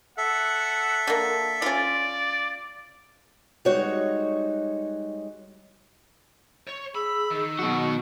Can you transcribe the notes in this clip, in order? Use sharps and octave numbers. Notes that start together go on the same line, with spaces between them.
A4 E5 F#5
D3 A#3
C#4 F4 D5
G3 G#3 D#4 F#4 C#5
C#5
G#4 B5 E6
D#3 E6
B2 F#3 F#4